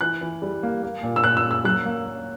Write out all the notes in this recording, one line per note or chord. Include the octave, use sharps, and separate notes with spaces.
E3 F#6
E3
G3
A#3
A#3
A#2
E6
A#2 F#6
E6
A#3
E6
F#3 F#6
A#3
A#3